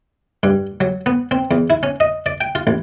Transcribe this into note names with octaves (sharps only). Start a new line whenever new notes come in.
G2
F#3
B3
C4
E2
E4
C#4
D#5
D5
G5
F4
A1